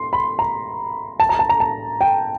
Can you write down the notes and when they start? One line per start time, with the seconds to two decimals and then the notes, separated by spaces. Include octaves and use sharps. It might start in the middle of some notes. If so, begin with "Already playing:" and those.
Already playing: C6
0.13 B5
0.39 A#5
1.20 A5
1.29 A#5
1.39 A5
1.49 A#5
1.60 A5
2.01 G5